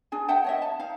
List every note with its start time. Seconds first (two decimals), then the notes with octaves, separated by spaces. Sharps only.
0.12 D4 G#4 G#5
0.28 E5 F#5 G5 A5
0.45 C#5 D#5 E5
0.62 A5
0.79 D#4 F5